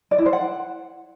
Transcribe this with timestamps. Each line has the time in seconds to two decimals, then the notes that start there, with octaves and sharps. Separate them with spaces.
0.11 D5
0.18 E4
0.26 C5
0.33 F#5